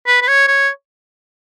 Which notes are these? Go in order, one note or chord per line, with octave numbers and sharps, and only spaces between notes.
B4
B4
C#5
C#5